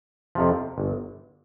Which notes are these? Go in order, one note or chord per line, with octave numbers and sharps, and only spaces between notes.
F2 C3 F3
G1